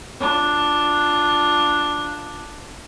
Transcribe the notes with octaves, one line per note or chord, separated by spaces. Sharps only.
D4 F4